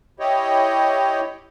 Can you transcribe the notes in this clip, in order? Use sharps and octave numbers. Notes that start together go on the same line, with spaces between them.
E4 G4 C#5 D#5 G5